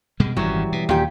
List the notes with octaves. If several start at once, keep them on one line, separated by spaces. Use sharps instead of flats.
B2 G3 G#3
G#1 F#2 C#3 E3 F#3 G3
B2
D#2 A#2 G4